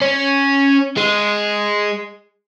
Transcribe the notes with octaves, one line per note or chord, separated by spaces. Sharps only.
C#4
G#3